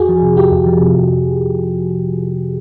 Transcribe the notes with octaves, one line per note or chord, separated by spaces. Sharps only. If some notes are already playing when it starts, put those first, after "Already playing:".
Already playing: F2 F#4 G#4
F3
C3
F2 F4 G4
F2
F3
C3
F2